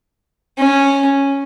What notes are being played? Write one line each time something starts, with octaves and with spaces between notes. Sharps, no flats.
C#4